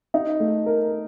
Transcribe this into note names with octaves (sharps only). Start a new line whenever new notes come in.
D#4
A3
A#4